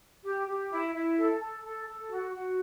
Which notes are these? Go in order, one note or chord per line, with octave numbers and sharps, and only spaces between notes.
G4
G4
E4
E4
A4
A4
A4
A4
F#4
F#4